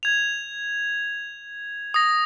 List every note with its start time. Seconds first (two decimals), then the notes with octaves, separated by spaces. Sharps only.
0.03 G#6 F7
1.94 D#6 A#6